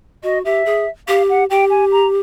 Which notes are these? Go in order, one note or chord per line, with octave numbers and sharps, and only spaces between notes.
F#4 D#5
G4 E5
G#4
G4 F5
F#5
G4 G5
G#5
A#5